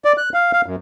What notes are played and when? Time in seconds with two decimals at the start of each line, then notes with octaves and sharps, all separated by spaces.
0.05 D5
0.18 F#6
0.34 F5
0.53 F5
0.66 F#2